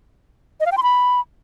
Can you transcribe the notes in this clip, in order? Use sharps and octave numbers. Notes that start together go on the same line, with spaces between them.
D#5
F5
G5
C6
B5